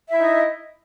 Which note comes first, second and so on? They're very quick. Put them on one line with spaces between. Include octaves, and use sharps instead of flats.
E5 E4 D#4 D#5